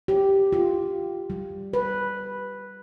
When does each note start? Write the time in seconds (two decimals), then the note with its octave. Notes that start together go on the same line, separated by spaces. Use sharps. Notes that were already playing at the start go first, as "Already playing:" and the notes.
0.08 G4
0.53 F4
1.30 G3
1.73 B4